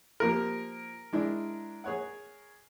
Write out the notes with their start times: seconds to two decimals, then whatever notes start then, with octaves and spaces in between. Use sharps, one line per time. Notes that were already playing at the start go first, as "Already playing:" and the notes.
0.20 F3 A#3 G4 A#4
1.13 G#3 D4 E4
1.84 G#4 C#5 F#5